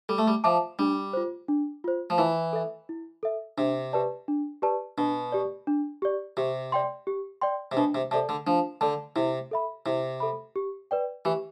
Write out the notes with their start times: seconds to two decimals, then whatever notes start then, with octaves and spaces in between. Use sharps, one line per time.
0.09 G3 A4
0.18 A3
0.27 G3
0.44 F3 E5 A5 D6
0.79 G3 D4
1.13 F4 C5
1.48 D4
1.84 F4 C5
2.10 F3
2.18 E3 E4
2.53 A4 E5
2.89 E4
3.23 A4 E5
3.58 C3 D4
3.93 G4 B4 D5 A5
4.28 D4
4.62 G4 B4 D5 A5
4.98 B2 D4
5.32 G4 D5
5.67 D4
6.02 G4 D5
6.37 C3 G4
6.72 D5 G5 C6
7.07 G4
7.41 D5 G5 C6
7.72 C3
7.77 B2 D4
7.95 C3
8.11 C3 A4 D5 A5
8.29 D3
8.47 F3 D4
8.81 D3 A4 D5 A5
9.16 C3 E4
9.51 A4 E5 B5
9.86 C3 E4
10.20 A4 E5 B5
10.56 G4
10.91 B4 D5 G5
11.25 E3 G4